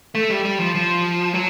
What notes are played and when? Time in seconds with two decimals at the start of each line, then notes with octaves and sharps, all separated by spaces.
0.15 A3
0.30 G3
0.45 G3
0.60 F3
0.75 F3
1.34 F#3